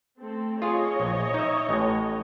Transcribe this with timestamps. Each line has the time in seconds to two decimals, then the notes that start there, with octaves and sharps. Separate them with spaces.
0.18 A3 C4 A4
0.62 F4 G#4 C#5 D#5
1.00 A#1
1.34 D#4 E5
1.69 A1 A2